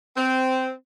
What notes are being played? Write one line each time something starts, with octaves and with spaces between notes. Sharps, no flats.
C4